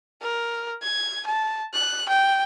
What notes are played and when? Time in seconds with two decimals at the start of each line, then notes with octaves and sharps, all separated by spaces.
0.22 A#4
0.82 G#6
1.26 A5
1.74 F#6
2.09 G5